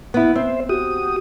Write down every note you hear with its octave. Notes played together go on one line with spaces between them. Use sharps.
B3 E4
C4 C5 E5
F#4 G4 D#6